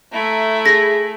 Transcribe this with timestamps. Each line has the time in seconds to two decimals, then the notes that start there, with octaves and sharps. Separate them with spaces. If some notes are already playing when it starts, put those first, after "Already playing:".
0.12 A3 E4 A#5
0.66 G#4 A#6